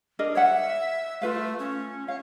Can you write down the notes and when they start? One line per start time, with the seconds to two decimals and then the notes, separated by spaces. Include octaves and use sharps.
0.19 D4 A#4 D#5
0.35 C#5 E5 F#5
1.22 A3 F4 B4 F5
1.59 C#4
2.08 C#5 F5